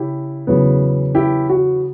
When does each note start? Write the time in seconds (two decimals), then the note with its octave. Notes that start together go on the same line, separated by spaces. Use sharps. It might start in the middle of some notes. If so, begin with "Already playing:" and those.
Already playing: C#3 E4 G4
0.47 E2 C#3 F#3 B3
1.15 E4 G4
1.49 F#4